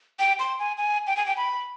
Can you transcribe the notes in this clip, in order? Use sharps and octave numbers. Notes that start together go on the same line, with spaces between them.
G5
C6
G#5
G#5
G5
G#5
G5
B5